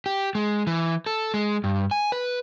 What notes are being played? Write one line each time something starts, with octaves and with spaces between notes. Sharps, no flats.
G4
G#3
E3
A4
G#3
G2
G#5
B4